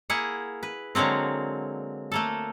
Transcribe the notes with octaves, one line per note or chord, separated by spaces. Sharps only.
A#3 E4 G#4 F#5
B4
D3 F#3 G#3 A#3 C4
A3 A#3 A4